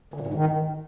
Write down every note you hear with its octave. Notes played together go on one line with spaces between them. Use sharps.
D3
A#2
G#2
D#3